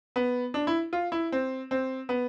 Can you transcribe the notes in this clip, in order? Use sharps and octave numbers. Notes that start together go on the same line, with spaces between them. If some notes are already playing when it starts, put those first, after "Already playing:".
B3
D4
E4
F4
E4
C4
C4
B3